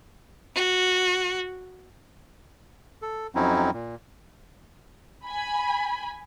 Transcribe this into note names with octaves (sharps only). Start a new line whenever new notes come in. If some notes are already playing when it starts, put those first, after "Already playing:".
F#4
A4
F2 F#3 C4 C#4 D#4 E4
A#2
G#5 B5